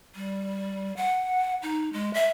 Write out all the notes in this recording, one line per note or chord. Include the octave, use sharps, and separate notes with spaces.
G3
F#5
D#4
G#3
E5